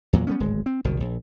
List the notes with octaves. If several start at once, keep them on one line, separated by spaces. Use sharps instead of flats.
E2 A#2 F#3
G3 A#3 B3 C#4
D1 G#1 G#3
C4
F#1 C2 B2 D#3
A#1